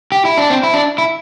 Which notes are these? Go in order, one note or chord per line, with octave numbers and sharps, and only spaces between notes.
G4
E4
D4
C4
E4
D4
E4